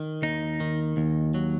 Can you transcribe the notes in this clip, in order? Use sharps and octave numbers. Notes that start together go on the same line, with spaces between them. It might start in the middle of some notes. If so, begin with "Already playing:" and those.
Already playing: D#3
D#2 D#4
D#3
D#2
F#3